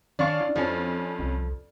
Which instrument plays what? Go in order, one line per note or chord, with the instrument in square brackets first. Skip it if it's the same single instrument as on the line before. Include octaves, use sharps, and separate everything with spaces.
[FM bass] D#3 [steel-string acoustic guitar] C#4 [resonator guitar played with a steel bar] D4 [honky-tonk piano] D5 F5 C#6
[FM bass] E4
[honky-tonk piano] F2 C#4 [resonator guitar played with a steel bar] F3 [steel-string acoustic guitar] A4
[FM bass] C2